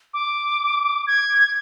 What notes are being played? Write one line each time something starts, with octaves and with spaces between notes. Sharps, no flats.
D6
G#6